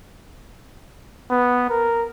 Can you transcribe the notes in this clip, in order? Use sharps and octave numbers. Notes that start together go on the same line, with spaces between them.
B3
A#4